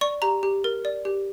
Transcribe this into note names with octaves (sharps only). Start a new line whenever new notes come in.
D5 C#6
G4 A#5
G4
A#4
D5
G4